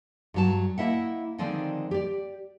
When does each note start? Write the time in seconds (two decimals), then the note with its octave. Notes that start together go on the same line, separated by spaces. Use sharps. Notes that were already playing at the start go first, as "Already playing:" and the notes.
0.34 G2 F#3 A5
0.78 A#3 E4 D#5 E5 F#5
1.38 D3 D#3 F3 G#3 C4 D5
1.91 G4 D5